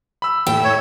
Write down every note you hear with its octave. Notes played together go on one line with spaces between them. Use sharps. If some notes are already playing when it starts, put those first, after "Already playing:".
B5 E6
A2 E5 G5
C#5